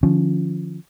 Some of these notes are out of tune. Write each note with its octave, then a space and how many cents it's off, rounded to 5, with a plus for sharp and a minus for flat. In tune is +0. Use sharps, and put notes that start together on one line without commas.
D3 +40 F3 +0 C#4 +0